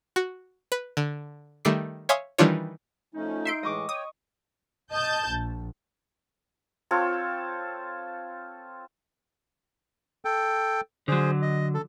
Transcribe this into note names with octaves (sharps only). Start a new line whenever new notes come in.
F#4
B4
D3
D#3 G3 A3 D6 C7
C#5 E5 F5 G#5 C6 D#6
D#3 E3 G3 D4 F4 C#5
F3 A3 C#4 D#4
E5 C6 D7
A2 E3 G#3 D#5 C#6 D6
C#5 G5 C#6 D#6
D#5 A5 G6
A#1
C4 F4 A4 C#5
A4 G5
D3 F#3 G#4 C5
D#5
A4